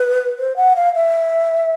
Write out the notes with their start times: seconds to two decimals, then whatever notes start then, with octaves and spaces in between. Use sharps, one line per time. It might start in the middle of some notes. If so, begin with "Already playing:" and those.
Already playing: B4
0.38 C5
0.57 F#5
0.76 F5
0.95 E5